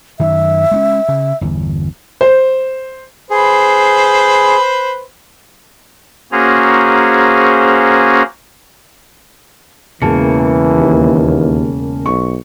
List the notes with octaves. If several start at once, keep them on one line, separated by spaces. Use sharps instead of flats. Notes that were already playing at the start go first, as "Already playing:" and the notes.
F#2 D#3 E5
G#3 B3 C#4
C#3
G1 E2
C5
G#4 B4 C5
A#3 C#4 F#4 G#4 C5 A#5
E1 C#3 E3 A#3 A5 C#7
D#2
B1 C#6